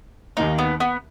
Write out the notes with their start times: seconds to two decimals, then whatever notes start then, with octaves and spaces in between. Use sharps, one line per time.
0.37 D#2 D#3 A#3 D#4
0.58 B3
0.80 B3